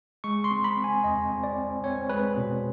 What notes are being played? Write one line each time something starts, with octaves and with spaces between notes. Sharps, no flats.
G#3 C#6
C6
C4
B5
C4
G#5
E2 D#5
C4
D5
C4
C4 C#5
G#3 B4
B2